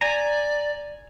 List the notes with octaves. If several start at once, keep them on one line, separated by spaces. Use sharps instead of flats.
D5 G#5 A#5